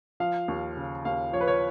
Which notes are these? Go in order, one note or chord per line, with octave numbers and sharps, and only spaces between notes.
F3 F5
D#2
C#3
D#2 F5
F3 C#5
B4
C#5